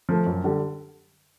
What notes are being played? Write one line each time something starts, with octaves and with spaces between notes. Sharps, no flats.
F3 A3
F#2
D3 G3